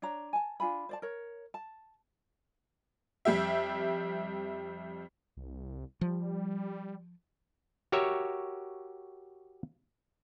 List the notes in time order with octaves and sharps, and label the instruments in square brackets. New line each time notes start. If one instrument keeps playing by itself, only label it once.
[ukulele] D4 C#5 A#5
G#5 A5
D4 F4 G#5 B5
C5 D5 A5
A#4 C#5
A5
[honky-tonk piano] F2 G3 G4 E5
[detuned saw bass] C2
[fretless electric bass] F3 [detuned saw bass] G3
[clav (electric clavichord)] F#4 G4 A#4 C#5 E5